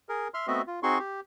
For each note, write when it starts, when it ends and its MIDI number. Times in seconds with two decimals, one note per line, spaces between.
0.09 0.28 68
0.09 0.28 70
0.34 0.47 76
0.34 0.47 84
0.34 0.47 89
0.47 0.62 57
0.47 0.62 59
0.47 0.62 60
0.47 0.62 66
0.47 0.62 75
0.47 0.62 76
0.67 0.80 65
0.83 0.98 60
0.83 0.98 63
0.83 0.98 66
0.83 0.98 68
0.83 0.98 84
0.83 0.98 85
0.99 1.20 67